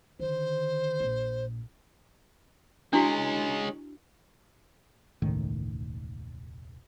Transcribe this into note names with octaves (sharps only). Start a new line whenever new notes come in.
D3 D#3 C5
A#1 A#2
G#3 C#4 D4 E4 F#4
E1 C#2 A2 D#3